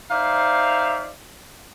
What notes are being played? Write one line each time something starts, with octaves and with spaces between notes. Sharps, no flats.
D#4 C5 D5 E5 F5